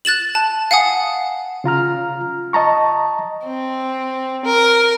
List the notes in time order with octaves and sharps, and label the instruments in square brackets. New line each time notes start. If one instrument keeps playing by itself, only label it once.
[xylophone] F#6 A6 E7 F#7
A5
F5 F#5 G#5 D#6
[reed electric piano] C#3 F4 A#5 F6
D#5 A5 A#5 C#6
[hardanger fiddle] C4
A#4